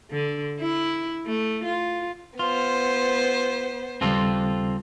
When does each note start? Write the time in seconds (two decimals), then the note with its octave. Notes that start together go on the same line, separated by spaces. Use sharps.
0.11 D3
0.60 E4
1.26 A3
1.64 F4
2.39 B3 F4 C5
4.01 D#2 C#3 G3 C4 F4 A4